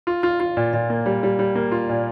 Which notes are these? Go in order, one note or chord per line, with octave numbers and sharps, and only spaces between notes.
F4
F4
F4
A#2
A#2
A#3
G3
G3
G3
A#3
F4
A#2